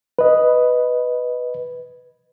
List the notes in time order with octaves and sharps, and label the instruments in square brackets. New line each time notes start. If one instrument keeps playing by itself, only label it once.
[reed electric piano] B4 D#5